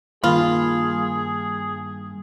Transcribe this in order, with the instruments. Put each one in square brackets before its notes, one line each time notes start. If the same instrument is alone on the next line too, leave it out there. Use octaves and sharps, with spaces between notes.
[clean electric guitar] G2 B5 [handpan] D#3 A#3 [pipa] F4 [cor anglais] G#4